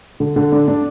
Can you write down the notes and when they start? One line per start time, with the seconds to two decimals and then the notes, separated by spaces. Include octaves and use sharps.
0.20 D3
0.36 D3
0.52 D4
0.68 D4